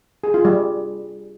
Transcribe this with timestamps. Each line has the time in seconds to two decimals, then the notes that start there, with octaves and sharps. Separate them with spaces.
0.24 G#4
0.34 F4
0.45 G3